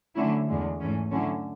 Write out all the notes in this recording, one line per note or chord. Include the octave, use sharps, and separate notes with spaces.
D3 F#3 A3 C#4 E4
E2 D3 G#3
G#2 E3 A3 C#4
D3 F#3 C#4 E4